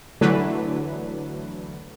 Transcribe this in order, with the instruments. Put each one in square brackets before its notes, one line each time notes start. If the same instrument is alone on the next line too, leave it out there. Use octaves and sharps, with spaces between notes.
[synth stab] D3 E3 F#3 A3 D4 B4